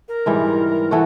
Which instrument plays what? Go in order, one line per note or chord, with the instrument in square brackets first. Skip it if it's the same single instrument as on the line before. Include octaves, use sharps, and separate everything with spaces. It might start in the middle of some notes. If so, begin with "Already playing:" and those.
[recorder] A#4
[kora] G#2 E3 G3
[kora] E3 A3 F#4 [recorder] A4